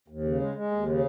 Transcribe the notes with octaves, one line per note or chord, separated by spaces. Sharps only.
D#2
C#3
G#3
G#3
D#2
C#3